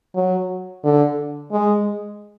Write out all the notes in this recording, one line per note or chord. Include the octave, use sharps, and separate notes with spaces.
F#3
D3
G#3